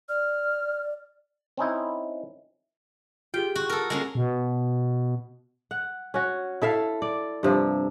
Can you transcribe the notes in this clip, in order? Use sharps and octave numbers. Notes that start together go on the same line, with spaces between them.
D5 F6
C4 C#4 D#4 E4
F4 G4 G#4 G5
F#4
A4 A#4
G#3 A#3 C#4
B2
F#5
C#4 F#4
E4 A4 E5 F5
D5
G2 C3 F3